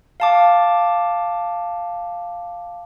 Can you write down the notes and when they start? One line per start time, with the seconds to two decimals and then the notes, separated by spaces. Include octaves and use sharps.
0.20 F5 A5 D6